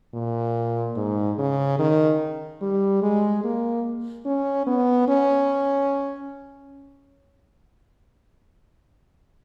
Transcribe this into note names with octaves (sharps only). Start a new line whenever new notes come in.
A#2
G#2
C#3
D#3
G3
G#3
A#3
C#4
B3
C#4